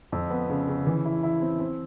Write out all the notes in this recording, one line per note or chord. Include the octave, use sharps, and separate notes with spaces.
F2
B3
C#3
C#3
E3
E4
E4
C4
C4